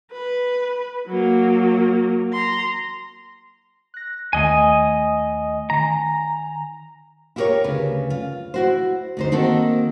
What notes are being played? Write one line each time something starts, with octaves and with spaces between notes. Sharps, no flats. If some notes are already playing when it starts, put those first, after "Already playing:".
B4
F#3 A#3
A#5 C6
F#6 A#6
D#2 D#3 A3 D#5 G#5
D#3 G#5 A#5
E4 F4 G4 G#4 A#4 C#5
D2 C#3 B4
F4
E4 F#4 C5
D2 D#4 C5
D#3 A#3 C4 D#4 F#4 A4